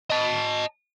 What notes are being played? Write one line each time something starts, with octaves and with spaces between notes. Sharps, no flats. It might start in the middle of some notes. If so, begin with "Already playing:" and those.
D#5 A5